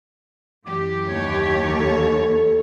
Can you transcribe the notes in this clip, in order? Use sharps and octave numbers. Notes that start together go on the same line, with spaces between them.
F#2 E3 G4 D6
D#2 C#5 G#6
A4